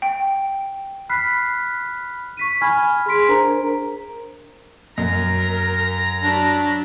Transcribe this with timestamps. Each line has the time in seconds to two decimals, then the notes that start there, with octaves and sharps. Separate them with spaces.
0.02 G5
1.09 B5 F6 F#6 B6 C7
2.37 C#6 B6 D#7
2.61 G#5 B5 F6 G#6
3.06 G#4 C6 B6 D7
3.28 D4 A#4 C5 A#5
4.98 F#2 A#4 A#5
6.23 F#3 D4 B5